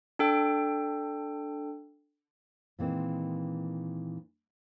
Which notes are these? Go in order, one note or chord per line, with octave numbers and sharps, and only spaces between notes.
D4 A4 G5
A#2 D#3 E3 G#3 C4